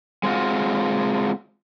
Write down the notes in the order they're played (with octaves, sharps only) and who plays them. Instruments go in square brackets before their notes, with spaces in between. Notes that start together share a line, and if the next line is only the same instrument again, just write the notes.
[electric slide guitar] G#3 C4 F4 F#4